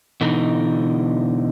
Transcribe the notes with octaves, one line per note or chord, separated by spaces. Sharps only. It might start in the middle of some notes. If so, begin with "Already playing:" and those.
B2 D3 E3 D#4